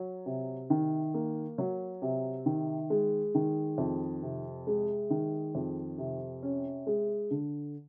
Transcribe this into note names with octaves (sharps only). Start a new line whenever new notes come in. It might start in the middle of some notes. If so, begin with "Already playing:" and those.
Already playing: F#3
C3
D#3
A#3
F#3
C3
D#3
G#3
D#3
F2
C3
G#3
D#3
F2
C3
C#4
G#3
D3